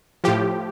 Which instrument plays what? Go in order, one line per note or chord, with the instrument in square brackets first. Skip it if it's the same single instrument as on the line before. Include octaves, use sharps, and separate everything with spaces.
[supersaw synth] A2 F3 G4